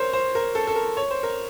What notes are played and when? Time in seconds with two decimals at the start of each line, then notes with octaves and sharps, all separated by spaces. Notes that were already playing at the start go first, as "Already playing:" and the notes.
Already playing: A#4 C5 C#5
0.13 C5
0.35 A#4
0.55 A4
0.67 A4
0.76 A#4
0.97 C#5
1.10 C5
1.23 A#4